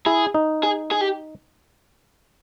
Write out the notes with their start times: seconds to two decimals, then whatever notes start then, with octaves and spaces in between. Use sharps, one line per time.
0.06 E4 G#4
0.34 D#4
0.63 G#4
0.91 G#4
1.01 G4